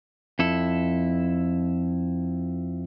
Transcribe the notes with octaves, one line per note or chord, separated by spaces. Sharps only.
F2 E4 A4